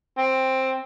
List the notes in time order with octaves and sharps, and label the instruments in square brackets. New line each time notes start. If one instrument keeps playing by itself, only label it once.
[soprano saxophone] C4